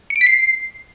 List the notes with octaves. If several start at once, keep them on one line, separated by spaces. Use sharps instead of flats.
C#7
D7
B6
C7